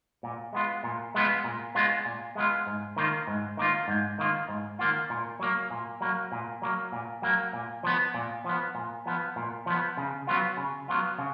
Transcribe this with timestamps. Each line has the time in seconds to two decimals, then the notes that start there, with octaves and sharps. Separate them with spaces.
0.23 A#2
0.53 G#3 B3 F4
0.84 A#2
1.15 G#3 B3 F4
1.44 A#2
1.75 G#3 B3 F4
2.05 A#2
2.35 G#3 B3 F4
2.66 G#2
2.97 D#3 A#3 F4
3.27 G#2
3.57 D#3 A#3 F4
3.88 G#2
4.19 D#3 A#3 F4
4.49 G#2
4.79 D#3 A#3 F4
5.10 A#2
5.40 F#3 A#3
5.70 A#2
6.01 F#3 A#3
6.32 A#2
6.62 F#3 A#3
6.92 A#2
7.22 F#3 A#3
7.53 A#2
7.83 F3 B3
8.14 A#2
8.45 F3 B3
8.75 A#2
9.06 F3 B3
9.36 A#2
9.66 F3 B3
9.97 C#3
10.27 F#3 B3 F4
10.57 C#3
10.88 F#3 B3 F4
11.18 C#3